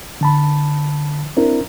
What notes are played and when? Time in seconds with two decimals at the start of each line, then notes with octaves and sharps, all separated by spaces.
0.21 D3 A5 B5
1.37 C4 D4 E4 A#4